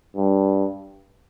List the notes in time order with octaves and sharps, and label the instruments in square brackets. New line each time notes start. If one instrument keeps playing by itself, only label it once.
[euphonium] G2